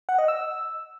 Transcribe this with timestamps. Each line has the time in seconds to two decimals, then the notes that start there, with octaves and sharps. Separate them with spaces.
0.09 F#5
0.18 D#5
0.28 E6